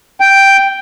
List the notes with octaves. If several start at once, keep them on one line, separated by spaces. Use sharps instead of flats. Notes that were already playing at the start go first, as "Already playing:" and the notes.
G5